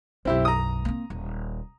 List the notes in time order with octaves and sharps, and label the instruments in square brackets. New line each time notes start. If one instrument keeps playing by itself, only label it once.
[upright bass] B1 F#2 [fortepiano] C4 E4 G4
[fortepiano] A#5 D#6
[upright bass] A#3 C4
D#1